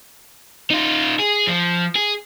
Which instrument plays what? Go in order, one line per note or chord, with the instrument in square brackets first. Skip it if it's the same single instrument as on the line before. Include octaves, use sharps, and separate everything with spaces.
[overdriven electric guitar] D#4 F4
G#4
F3
G#4